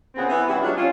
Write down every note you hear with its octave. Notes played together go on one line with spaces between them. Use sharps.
A#2 C#3 B3 C4 G#4
E3 B3
C3 G3 C#4 E4 G4
F#3 G#3 C#4 D4 F4
C4 C#4 F4